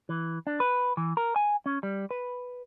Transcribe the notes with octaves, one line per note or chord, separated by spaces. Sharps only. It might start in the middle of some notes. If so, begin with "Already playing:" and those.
E3
D4
B4
E3
A#4
G#5
C#4
G3
B4